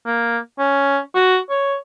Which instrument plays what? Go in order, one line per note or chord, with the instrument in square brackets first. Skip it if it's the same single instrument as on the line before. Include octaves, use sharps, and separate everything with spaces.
[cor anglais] A#3
C#4
F#4
C#5